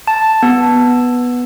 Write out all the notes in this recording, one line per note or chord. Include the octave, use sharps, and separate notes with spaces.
A5
B3